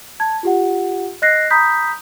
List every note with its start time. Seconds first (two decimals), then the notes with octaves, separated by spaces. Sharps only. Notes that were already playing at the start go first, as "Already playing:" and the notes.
0.20 A5 G#6
0.43 F4 G4 F#5
1.22 D#5 F#6 A#6 C7
1.50 A#5 B5 D#6 G6 B6